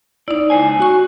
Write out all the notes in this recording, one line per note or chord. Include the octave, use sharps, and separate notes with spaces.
D#4 E4 D5
C#2 C5 G#5
F#4 G#5 C#6